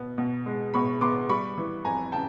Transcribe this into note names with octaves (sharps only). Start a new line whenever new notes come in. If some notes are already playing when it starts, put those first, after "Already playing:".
Already playing: B2 B3
B2
G#3
B2 B5 C#6
B3 C6 D6
G3 B5 C#6
E3
F2 G#5 A#5
C#3 G5 A5